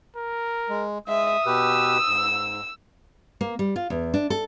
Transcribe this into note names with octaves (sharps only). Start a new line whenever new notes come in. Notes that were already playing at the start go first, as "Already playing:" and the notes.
A#4
G#3
G#3 E5 D#6
B2 G4 B4 E6
G#2
A#3
G3
F4
E2
D4
A4